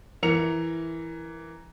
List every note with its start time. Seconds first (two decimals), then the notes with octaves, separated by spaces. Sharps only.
0.23 E3 A#4 C#7 F7